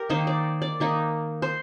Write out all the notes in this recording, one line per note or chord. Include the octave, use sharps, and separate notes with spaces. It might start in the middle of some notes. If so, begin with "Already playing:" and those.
Already playing: G4 A#4
D#3 A#3 D#4 C5
D5
D5
D#3 A#3 D#4
C5